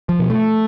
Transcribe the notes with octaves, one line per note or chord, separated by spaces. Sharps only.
F3
B2
A3